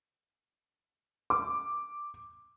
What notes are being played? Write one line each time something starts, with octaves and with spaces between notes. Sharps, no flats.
D6